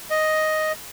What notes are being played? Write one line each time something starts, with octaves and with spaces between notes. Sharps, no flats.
D#5